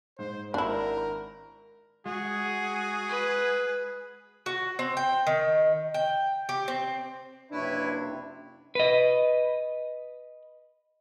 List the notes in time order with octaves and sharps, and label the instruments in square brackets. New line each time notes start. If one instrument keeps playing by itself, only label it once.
[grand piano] G#2 [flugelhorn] C5
[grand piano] G#1 F#5 [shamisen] D4 E4 [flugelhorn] A#4
[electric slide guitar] G#3 [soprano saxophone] F#4 [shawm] G#4
[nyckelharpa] B4
[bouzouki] F#4
C4
G5
D#3
G5
G4
C4
[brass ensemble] F#1 C3 D4 [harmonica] E4 B4 C#5
[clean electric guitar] B4 D#5